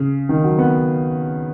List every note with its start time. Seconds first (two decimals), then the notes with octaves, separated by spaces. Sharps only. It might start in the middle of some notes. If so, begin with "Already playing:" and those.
Already playing: C#3
0.29 D#3
0.44 F#3
0.58 B3